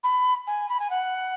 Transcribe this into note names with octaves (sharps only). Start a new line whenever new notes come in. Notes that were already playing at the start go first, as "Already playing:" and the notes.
B5
G#5
B5
G#5
F#5